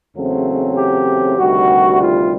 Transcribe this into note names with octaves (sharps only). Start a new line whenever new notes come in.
E2 C#3 F#3 A3 C4
G4
D2 C3 D#3 G3 F#4
F4